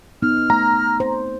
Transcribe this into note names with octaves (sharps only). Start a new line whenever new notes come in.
B3 D#4 F6
A3 A#5
C5